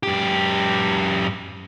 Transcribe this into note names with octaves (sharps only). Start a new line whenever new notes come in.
F#2 G4